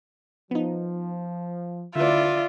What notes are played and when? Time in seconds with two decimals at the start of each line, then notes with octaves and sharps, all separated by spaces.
0.51 F3 B3 D#4
1.95 D2 D3 E4 F4 B4 D5 E5